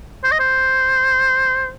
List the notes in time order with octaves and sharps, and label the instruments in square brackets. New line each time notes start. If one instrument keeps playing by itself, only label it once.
[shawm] C5
D#5
C5